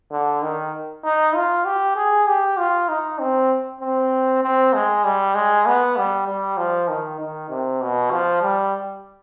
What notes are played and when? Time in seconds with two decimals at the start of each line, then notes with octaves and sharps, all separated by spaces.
0.11 D3
0.42 D#3
1.04 D#4
1.35 F4
1.65 G4
1.96 G#4
2.27 G4
2.58 F4
2.89 D#4
3.19 C4
3.81 C4
4.43 C4
4.74 G#3
5.04 G3
5.35 G#3
5.66 B3
5.97 G3
6.27 G3
6.58 F3
6.89 D#3
7.20 D#3
7.50 C3
7.82 B2
8.11 F3
8.42 G3